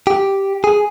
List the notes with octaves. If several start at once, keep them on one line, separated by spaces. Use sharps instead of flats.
G4
G#4